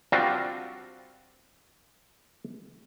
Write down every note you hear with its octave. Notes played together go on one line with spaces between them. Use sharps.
G3 C4 D4 F4 F#4